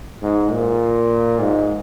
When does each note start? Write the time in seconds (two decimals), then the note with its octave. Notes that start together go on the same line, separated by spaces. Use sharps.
0.22 G#2
0.51 A#2
1.39 G#2